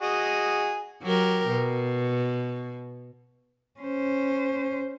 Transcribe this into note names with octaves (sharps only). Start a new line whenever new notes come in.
F#4 G#4 D#5
F#3 G4 A#4
B2
C#4 C5